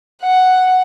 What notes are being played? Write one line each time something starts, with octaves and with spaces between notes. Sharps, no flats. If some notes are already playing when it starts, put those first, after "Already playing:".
F#5